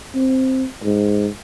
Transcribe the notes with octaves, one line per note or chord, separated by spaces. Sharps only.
C4
G#2